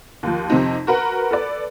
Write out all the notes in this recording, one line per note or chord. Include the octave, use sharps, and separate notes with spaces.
D#2 F3
F2 C3 C4 D#4
F#4 A#4 B4 F#5
A4 B4 D5